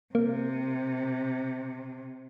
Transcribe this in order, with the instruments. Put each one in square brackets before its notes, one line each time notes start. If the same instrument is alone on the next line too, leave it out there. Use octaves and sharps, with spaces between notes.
[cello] C3 [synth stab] A#3